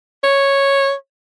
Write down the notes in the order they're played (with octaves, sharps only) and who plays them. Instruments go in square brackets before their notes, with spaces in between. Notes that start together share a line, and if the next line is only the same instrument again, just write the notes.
[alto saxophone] C#5